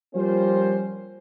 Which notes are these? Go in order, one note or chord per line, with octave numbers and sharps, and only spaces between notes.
F3 G3 A#3 C#4 F4 C5